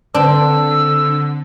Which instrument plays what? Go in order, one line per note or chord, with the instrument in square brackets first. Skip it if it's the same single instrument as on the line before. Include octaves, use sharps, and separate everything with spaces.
[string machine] D3 [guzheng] C4 D4 [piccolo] E6